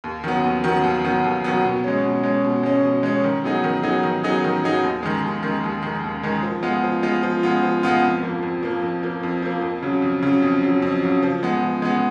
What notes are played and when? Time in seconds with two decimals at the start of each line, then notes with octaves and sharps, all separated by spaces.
0.04 D#2
0.24 D#3 F#3 B3
0.44 D#2
0.64 D#3 F#3 B3
0.83 D#2
1.04 D#3 F#3 B3
1.24 D#2
1.44 D#3 F#3 B3
1.65 B2
1.84 G#3 C#4
2.04 B2
2.23 G#3 C#4
2.44 B2
2.63 G#3 C#4
2.83 B2
3.03 G#3 C#4
3.24 D#3
3.44 F#3 B3 D#4 G#4
3.64 D#3
3.83 F#3 B3 D#4 G#4
4.03 D#3
4.23 F#3 B3 D#4 G#4
4.44 D#3
4.63 F#3 B3 D#4 G#4
4.83 D#2
5.03 D#3 G#3
5.23 D#2
5.43 D#3 G#3
5.64 D#2
5.83 D#3 G#3
6.04 D#2
6.23 D#3 G#3
6.43 F3
6.63 G#3 B3 F4
6.84 F3
7.03 G#3 B3 F4
7.23 F3
7.43 G#3 B3 F4
7.63 F3
7.83 G#3 B3 F4
8.03 F2
8.23 F3 A#3
8.43 F2
8.63 F3 A#3
8.82 F2
9.03 F3 A#3
9.23 F2
9.42 F3 A#3
9.62 F2
9.83 C#3 F#3
10.02 F2
10.23 C#3 F#3
10.42 F2
10.63 C#3 F#3
10.82 F2
11.02 C#3 F#3
11.23 F3
11.43 G#3 B3
11.63 F3
11.82 G#3 B3